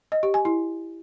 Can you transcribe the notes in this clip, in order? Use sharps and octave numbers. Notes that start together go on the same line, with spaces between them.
D#5
G4
G#5
E4